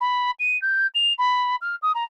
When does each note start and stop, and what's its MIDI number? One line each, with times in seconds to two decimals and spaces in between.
0.01 0.31 83
0.39 0.60 99
0.62 0.87 91
0.95 1.13 101
1.18 1.56 83
1.61 1.75 89
1.82 1.92 87
1.95 2.04 82